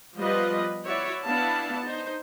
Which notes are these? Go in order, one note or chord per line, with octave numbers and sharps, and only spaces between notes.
F3 G3 B3 F4 B4 D#5
E4 F#4 C#5 D5 E5
B3 D4 E4 F5 A5
D#4 C5